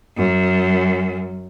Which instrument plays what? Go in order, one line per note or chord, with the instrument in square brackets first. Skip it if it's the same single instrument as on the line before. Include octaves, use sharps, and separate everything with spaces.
[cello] F#2